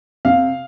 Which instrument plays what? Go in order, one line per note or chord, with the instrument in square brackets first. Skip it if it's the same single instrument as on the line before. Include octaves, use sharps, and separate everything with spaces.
[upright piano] C3 F5